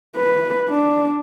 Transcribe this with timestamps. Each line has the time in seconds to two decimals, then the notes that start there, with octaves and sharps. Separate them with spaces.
0.17 B4
0.69 D4